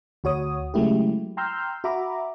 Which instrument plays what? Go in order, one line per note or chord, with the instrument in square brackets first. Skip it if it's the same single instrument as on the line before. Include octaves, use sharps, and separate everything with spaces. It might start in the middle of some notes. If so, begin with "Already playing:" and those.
[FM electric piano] D2 F#4 C#5 D#6
C#3 F#3 G#3 A3 E4 G4
G5 A#5 C6 E6 F6 G6
F#4 E5 A#5 B5 D6